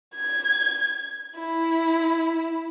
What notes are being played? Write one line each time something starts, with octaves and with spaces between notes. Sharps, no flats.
G#6
E4